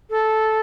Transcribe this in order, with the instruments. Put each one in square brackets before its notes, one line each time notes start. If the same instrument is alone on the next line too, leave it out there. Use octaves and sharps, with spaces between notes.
[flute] A4